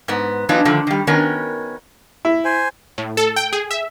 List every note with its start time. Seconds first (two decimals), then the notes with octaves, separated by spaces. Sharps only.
0.08 G#2 B3
0.49 E3 F#3 B3 D4 D#4 F4
0.65 D3 D#3 F3 A3
0.87 D#3 G3
1.07 D#3 B3 C#4 F#4 A#4
2.25 E4
2.45 C5 G#5
2.98 A2
3.17 A4
3.36 G5
3.53 G#4
3.71 E5